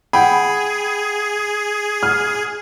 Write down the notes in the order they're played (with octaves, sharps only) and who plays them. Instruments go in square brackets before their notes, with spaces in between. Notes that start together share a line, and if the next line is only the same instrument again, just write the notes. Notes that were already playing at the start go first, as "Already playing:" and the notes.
[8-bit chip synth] G#4 [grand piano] F#5 G5 B5
[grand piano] F6